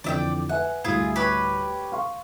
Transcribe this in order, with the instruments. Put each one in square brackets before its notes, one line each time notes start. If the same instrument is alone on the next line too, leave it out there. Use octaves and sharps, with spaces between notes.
[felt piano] F2 D3 E3 [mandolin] D5 E5 G5
[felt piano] B4 E5 G#5 [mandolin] F#5
[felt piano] D2 A2 G3 [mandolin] E4 F4 G#4
[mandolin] G4 B4 C#5
[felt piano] F5 C6 C#6